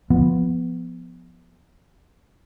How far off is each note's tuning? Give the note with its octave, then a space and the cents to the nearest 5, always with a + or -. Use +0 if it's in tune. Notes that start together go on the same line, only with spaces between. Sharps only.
F3 +0 B3 +0